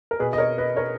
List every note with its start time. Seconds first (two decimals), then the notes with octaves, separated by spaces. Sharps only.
0.11 A#4
0.19 B2 G#4 B4
0.33 D#5
0.38 A#4 C#5
0.58 B4 D#5
0.77 A#4 C#5